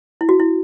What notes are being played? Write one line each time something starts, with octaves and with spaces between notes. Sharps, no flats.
E4
F#4
E4